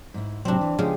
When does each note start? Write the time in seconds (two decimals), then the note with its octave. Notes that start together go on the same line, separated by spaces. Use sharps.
0.14 G#2 E4
0.45 A2 C3 F#3 C4 D4
0.61 E3
0.79 C#3 F3 G#3 B3 G4